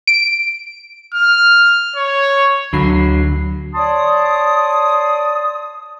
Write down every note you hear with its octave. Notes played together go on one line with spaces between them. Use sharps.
D7
F6
C#5
D2 D3 F#3 B5 C7
C#5 D5 A5 C6 D#6